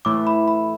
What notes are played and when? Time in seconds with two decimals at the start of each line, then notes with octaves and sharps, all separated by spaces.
0.05 A2 E3 A3 E4 D6
0.27 B5
0.48 B5